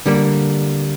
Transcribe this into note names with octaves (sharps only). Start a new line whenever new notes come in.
D3 G3 A#3